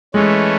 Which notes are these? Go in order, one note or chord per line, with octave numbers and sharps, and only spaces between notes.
E3 G#3 A3 C#4